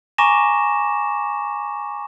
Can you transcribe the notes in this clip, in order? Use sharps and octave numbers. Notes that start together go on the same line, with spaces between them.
G#5 A#5 C#6 D6 A#6 E7